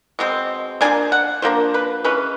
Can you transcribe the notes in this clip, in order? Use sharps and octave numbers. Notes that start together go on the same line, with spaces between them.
B2 G#3 C4
F3 A#3 D4 G#5
F#5
F3 A#3 D4 C5
B4
E3 G#3 C#4 B4